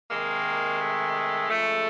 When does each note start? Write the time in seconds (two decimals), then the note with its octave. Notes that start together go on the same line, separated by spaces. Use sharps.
0.10 C3 D#3 G#3 A#3
0.80 A3
1.50 C#3 F3 G#3 A3